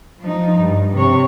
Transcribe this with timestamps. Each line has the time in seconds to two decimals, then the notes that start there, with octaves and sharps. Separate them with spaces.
0.20 F3 D#4
0.59 G2
0.93 C3 C#5